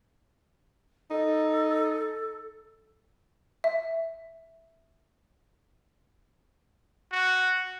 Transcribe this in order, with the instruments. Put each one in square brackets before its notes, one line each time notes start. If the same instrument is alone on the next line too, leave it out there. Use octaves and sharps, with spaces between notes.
[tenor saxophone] D#4 [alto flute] A4
[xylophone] E5
[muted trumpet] F#4